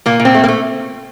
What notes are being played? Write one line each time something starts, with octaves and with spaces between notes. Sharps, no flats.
A#2 A#3
A#2
C4
A3
A#3
A3